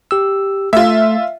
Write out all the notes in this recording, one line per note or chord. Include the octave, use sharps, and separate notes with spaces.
G4 E6
A3 F4 E5